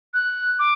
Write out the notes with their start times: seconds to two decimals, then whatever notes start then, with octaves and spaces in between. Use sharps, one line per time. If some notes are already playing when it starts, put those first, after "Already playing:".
0.14 F#6
0.59 D6